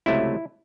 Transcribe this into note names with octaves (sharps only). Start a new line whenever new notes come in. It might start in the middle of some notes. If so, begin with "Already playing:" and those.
C#2 C3 F#3 A3 E4